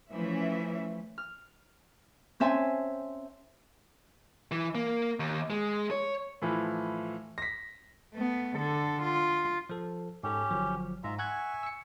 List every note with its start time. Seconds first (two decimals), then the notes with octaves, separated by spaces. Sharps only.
0.12 E3 F3 A3 C#4 E5
1.18 F6
2.40 C4 C#4 E5 G#5 A5 C6
4.51 E3
4.75 A#3
5.20 D#2
5.50 G#3
5.91 C#5
6.42 A2 E3 F3
7.38 A#6 B6
8.14 A3 B3
8.57 D3 A4
9.03 F4
9.69 F3 A4
10.23 G#2 C#4 G4 A4
10.51 G1 F3 F#3
11.04 G#2 F4 E5 A#5
11.19 E5 F#5 G#5 C#6 F#6 G#6
11.63 E6 C#7